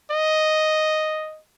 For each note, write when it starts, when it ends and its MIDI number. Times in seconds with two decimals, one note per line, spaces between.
0.11 1.40 75